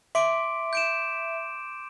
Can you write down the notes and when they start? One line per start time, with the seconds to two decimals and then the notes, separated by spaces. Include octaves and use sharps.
0.15 E5 C6 D6 D7
0.73 G6 D7 E7